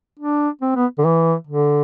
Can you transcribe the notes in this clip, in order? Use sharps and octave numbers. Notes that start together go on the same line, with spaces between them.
D4
C4
B3
D3
E3
D3